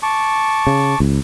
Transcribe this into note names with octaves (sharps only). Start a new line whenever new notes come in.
A5 C#6 D6
C#3
C#2